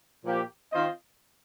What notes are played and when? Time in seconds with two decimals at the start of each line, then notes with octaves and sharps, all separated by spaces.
0.24 A#2 F3 A#3 G4
0.71 D#3 C4 F4 C5 D#5